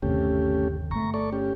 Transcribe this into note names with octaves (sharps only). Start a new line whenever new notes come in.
G1 D#2 C3 A3 C#4 G4
G1 A3 A#5 C#6
A4 D5 C#6
C#4 G4